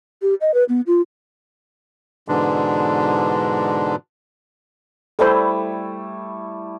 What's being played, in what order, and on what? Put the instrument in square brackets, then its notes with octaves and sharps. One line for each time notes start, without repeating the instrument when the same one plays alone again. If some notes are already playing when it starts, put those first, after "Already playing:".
[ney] G4
D#5
B4
B3
F4
[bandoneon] G#2 B2 D3 E3 G#3 D4
[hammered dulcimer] G3 A3 E4 [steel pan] A4 C5